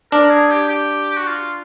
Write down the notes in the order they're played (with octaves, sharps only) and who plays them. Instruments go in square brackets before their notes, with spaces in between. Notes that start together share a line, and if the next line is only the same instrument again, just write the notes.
[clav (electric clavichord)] D4 [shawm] A#4
[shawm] G#4
G4
G4
F#4
F4